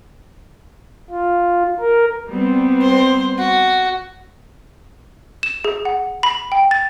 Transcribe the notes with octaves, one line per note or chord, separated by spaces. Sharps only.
F4
A#4
G3 B3 C4
C5
F#4
E7
G#4
F#5
B5
G5
A6